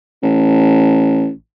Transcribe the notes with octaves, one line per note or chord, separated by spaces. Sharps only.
A1